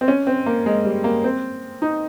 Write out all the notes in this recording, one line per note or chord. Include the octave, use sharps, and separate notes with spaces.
C4
C#4
C4
A#3
G#3
G3
A#3
C4
D#4